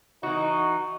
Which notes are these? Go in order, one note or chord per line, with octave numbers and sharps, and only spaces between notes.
E3 D#4 F#4